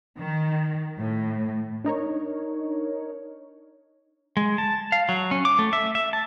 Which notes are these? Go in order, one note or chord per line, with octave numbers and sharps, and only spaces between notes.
D#3
A2
D4 D#4 A#4 C#5
G#3
A5
F5
F#3
C#4
D6
A3
E5
E5
A5